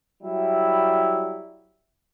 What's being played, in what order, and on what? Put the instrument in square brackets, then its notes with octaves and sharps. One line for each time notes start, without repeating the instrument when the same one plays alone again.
[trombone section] F#3 G3 E4